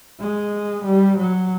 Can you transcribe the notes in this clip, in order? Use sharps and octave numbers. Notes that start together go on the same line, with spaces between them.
G#3
G3
F#3